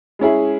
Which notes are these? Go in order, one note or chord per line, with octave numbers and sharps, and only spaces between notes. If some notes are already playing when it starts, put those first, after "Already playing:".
G#3 C#4 E4 G#4